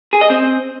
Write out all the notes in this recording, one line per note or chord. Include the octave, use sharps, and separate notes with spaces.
G#4
D#5
C4